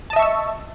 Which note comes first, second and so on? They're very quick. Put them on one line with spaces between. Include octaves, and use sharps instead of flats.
A5 D#5 E5 C#6 E6